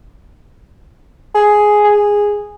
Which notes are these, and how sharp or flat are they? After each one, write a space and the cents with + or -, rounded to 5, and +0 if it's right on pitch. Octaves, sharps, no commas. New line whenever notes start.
G#4 +5
G#4 -10